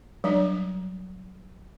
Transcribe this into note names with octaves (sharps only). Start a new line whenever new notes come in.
F#3 G3 D4